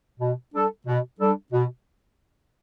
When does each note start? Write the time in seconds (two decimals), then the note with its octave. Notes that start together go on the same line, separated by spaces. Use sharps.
0.20 B2
0.54 G3 D4 A4
0.87 B2
1.20 G3 D4 A4
1.53 B2